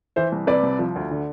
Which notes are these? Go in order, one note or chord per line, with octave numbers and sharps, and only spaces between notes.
E3 C5 E5
C2
C3 B4 D5
C2
F3
D2
D3